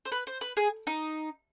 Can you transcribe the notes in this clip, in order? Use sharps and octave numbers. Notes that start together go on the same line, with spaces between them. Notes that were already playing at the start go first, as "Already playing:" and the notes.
C5
B4
C5
B4
G#4
D#4